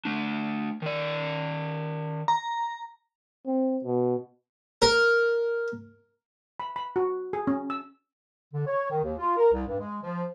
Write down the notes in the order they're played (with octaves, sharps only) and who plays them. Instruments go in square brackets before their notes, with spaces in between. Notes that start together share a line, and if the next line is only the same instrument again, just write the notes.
[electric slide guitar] A3 D4
D#3 D5
[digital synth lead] A#5
[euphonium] C4
B2
[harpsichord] A#4
[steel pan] B5
B5
F#4
G#4
C#4
E6
[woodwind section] D3
C#5
D#3
D#2
F4
A#4
C2
G2
G#3
F3